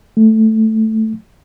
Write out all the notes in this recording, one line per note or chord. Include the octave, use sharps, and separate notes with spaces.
A3